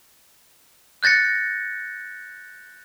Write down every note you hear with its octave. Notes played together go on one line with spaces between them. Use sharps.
F#6 G6 A6 A#6 C#7